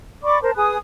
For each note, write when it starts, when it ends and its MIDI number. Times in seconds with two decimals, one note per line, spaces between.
0.23 0.38 74
0.23 0.38 83
0.23 0.38 85
0.23 0.38 86
0.42 0.51 70
0.42 0.51 72
0.42 0.51 81
0.55 0.77 68
0.55 0.77 71
0.55 0.77 80
0.55 0.77 87